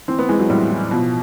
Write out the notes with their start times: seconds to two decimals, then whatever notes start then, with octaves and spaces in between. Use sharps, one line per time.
0.08 E3 C4
0.19 B3
0.29 E3 G#3
0.39 F#3
0.50 A2 G3
0.71 E3
0.91 B2 F3